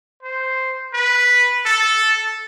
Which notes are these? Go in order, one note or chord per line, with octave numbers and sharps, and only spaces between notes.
C5
B4
A4